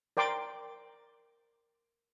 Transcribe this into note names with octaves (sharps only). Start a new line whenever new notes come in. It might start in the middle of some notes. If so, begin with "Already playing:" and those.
A#4 D5 G5 C6 D6